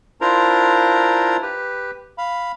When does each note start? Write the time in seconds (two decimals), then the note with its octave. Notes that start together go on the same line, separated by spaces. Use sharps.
0.21 D4 E4 F4 A#4 C5 A#5
1.42 G4 B4
2.18 F5 B5